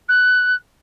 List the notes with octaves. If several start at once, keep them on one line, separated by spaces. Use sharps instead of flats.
F#6